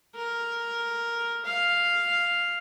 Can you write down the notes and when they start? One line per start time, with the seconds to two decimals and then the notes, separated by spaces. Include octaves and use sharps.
0.15 A#4
1.45 F5